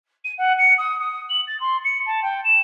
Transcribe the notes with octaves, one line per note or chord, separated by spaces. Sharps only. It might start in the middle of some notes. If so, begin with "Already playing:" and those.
D#7
F#5
C#7
D#6
D#6
F#7
A6
C6
C#7
A5
G5
E7